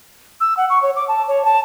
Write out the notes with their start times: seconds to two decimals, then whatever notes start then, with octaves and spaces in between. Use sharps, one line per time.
0.41 E6
0.57 F#5
0.70 C#6
0.83 C#5
0.96 D6
1.08 A5
1.28 C#5
1.45 A5